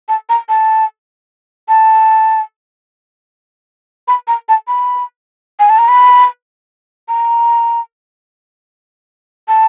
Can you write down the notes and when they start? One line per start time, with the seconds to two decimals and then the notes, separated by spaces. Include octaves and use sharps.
0.09 A5
0.29 A#5
0.49 A5
1.69 A5
4.08 B5
4.28 A#5
4.49 A5
4.68 B5
5.59 G#5
5.70 A5
5.78 A#5
5.88 B5
7.09 A#5
9.48 A5